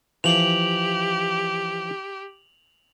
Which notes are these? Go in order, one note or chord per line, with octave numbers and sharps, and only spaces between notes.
E3 F3 G4 F7 F#7